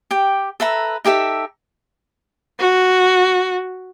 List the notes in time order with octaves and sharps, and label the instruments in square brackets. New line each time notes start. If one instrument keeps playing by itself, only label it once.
[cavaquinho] G4 G5
A4 B4 E5 A#5
D#4 G4 A4 E5
[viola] F#4